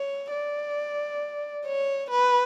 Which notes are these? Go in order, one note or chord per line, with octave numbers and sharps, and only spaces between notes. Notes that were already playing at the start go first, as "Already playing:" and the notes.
Already playing: C#5
D5
C#5
B4